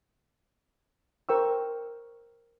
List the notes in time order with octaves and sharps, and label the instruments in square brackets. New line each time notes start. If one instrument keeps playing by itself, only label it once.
[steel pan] A#4 C5 G5 C#6 E6